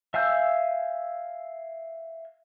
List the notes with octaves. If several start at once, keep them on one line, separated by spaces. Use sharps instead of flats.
E5 F5 G#5 E6 G6